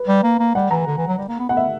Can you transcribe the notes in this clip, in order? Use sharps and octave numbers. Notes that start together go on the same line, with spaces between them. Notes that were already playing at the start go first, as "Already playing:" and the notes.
Already playing: B4
G3
A#3
A#3
G3 F#5
E3 A#5
D3
E3
F#3
G3
A#3
B3
B3 F#5
E5